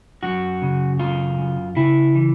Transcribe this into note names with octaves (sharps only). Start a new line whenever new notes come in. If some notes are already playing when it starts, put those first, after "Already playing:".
F#2 F#4
C#3
F#2 F4
F#2
C#3 E4
E3